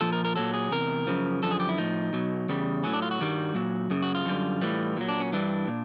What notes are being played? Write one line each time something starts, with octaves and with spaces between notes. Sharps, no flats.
A#2 F3 A4
A#4
A#4
A#2 F#3 A4
G#4
E2 C3 A#4
F#2 C#3 F3
F#2 D3 F3 A4
G#4
G4
E4
A2 F3 D#4
B2 F#3
E2 C#3 G3
A2 F#3 C#4
D4
F4
F#4
G2 D#3 G3
A#2 F#3
F#2 C#3
F#4
F4
F#2 D3 G3
A2 E3 G3
A#2 F#3
D4
C#4
G2 E3 G3 D4
A#2